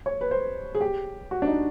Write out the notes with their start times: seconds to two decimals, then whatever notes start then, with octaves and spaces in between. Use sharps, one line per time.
0.06 C#5
0.21 B4
0.31 C5
0.75 G#4
0.81 G4
1.31 F#4
1.42 D4
1.47 D#4